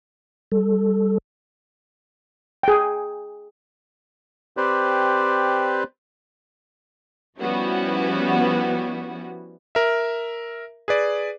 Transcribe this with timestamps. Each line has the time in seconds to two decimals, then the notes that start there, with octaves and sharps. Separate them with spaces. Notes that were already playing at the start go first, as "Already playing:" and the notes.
0.52 G3 A4
2.63 G#4 G5
4.57 C4 G4 B4 C5 D5
7.40 F3 G3 B3 C#4 E4 F#4
9.75 A#4 E5
10.88 G#4 B4 D5